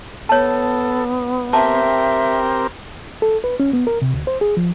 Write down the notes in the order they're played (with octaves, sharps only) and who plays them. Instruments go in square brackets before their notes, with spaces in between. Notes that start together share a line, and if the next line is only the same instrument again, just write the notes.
[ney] B3 [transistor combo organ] A4 [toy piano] C#5 A5
[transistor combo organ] C4 G4 A#4 [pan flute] E5 [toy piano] A5
[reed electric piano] A4
B4
C#4
B3
A#4
C3
D2
C5
G#4
F3